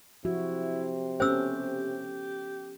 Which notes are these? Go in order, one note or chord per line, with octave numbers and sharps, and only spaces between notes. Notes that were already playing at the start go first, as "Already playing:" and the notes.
C3 F3 E4 F#4
B3 C#4 G4 A4 C5 E6